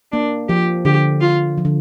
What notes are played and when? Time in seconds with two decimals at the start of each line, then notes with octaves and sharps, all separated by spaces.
0.12 A#3 D4
0.49 F3 G4
0.85 D3 G4
1.21 F4
1.58 F3
1.65 D3